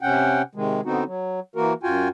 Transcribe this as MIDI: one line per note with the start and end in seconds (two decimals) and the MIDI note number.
0.01 0.42 48
0.01 0.42 61
0.01 0.42 78
0.01 0.42 79
0.55 0.81 48
0.55 0.81 51
0.55 0.81 56
0.85 1.04 50
0.85 1.04 59
0.85 1.04 60
0.85 1.04 63
0.85 1.04 66
1.06 1.40 54
1.56 1.73 52
1.56 1.73 58
1.56 1.73 66
1.56 1.73 70
1.83 2.08 42
1.83 2.08 65
1.83 2.08 66
1.83 2.08 79
1.83 2.08 80